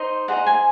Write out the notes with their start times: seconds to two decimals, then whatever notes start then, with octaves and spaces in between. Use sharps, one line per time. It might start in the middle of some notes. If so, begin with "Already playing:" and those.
Already playing: D#4 C5 D#5
0.28 D#4 G#4 C5 F#5
0.46 G#5